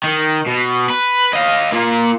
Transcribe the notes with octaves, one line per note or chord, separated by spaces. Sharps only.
D#3
B2
B4
D#5 F5
A#3 F4